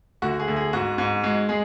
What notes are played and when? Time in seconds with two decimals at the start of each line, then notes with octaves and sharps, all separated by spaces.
0.22 D2 F#4
0.40 G#4
0.48 D2
0.56 G#4
0.73 G#2 F#4
0.98 G#2
1.23 G#3 F#4
1.49 G#3 G#4